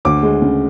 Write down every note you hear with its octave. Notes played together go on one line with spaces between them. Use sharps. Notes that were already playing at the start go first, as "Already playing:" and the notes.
D2 D6
G#3
C#3